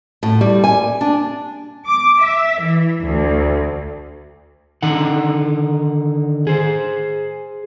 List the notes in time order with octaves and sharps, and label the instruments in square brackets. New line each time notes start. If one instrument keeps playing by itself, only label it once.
[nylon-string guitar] A2
G3
G#5
D4
[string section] D6
E5
E3
D2
[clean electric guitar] D3 D#3 D#4 F#5
G#4 C5